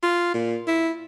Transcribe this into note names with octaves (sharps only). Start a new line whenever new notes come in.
F4
A#2
E4